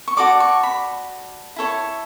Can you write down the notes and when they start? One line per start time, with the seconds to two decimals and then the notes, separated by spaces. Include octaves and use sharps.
0.08 C#6
0.17 F#4 A4 D5 D6
0.40 C#6
0.63 B5
1.56 E4 A4 C#5